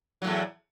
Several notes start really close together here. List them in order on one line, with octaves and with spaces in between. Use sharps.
F#3 A2 E2